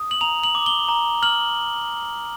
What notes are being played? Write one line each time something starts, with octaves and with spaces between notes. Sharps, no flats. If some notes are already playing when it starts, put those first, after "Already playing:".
Already playing: D#6
F#7
A#5 F7
F#7
D6
G7
A#5
F6 F#7